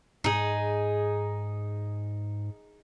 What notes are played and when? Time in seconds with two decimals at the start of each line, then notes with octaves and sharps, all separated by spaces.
0.24 G#2 D#4 G#4